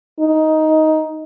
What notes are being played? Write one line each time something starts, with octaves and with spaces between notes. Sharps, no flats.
D#4